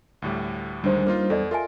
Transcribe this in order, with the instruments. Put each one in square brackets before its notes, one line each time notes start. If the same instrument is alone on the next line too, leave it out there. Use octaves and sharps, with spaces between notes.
[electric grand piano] D2 A2 G3
[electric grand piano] D2 D#3 G#3 [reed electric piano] G3 D4 C5
[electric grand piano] A#3 D#4 F4 [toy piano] B4
[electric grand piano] E2 [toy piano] A4 D5 D#5
[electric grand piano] F4 [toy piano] A#4 E5 G#5